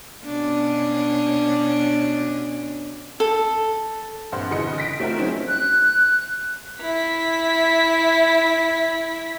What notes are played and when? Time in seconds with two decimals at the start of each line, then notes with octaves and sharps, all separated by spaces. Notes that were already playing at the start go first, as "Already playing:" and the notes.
0.25 B2 C#4 D4
3.20 A4
4.32 A#1 G2 C4 F#5 C6
4.51 G1 C#3 E3 D#5 C#7
4.78 A#6 B6 D7
5.00 A3 C4 F4 F#4 A#4
5.18 E3 F#3 G#3 C4 C#4 D#4
5.48 F#6
6.81 E4 B6